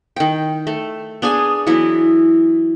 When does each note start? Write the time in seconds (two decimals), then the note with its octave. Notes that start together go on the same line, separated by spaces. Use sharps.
0.16 D#3 G5
0.67 A3
1.22 B3 D4 G#4 G#5
1.67 E3 F#3 B3 E4